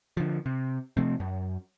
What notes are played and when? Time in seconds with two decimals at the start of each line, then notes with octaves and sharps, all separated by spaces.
0.17 D3 F3
0.46 C3
0.97 C3 F3 A3 C4
1.20 F#2